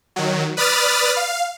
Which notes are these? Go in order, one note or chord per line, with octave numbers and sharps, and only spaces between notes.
D#3 F#3
B4 D5 B5 D#6 F6 A6
F5